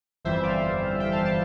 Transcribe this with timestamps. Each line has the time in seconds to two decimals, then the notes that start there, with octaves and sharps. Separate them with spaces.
0.25 G1 F2 E3 G3 C5 E5
0.43 D5 F5
1.00 E5 G5
1.12 F5 A5
1.25 F5 A5